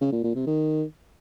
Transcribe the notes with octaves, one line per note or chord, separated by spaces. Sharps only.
C#3
A#2
A#2
C3
D#3